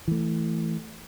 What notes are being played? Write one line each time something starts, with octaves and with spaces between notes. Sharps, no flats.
E3 A3